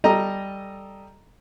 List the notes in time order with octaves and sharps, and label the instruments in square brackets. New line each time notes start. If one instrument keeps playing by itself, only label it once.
[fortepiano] G3 A4 D#5 A#5